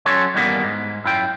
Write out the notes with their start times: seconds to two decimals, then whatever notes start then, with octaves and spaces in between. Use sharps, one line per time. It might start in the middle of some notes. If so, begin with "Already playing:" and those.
0.05 F#3 C#4 F#4 A4 C#5 C6
0.34 E2 G2 D#3 G3 A#3 B3
0.64 G#2
1.05 F#2 E4 F4 G5